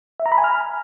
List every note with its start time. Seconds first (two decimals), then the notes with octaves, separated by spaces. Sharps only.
0.20 E5
0.26 A#5
0.32 B5
0.38 G#5
0.44 F6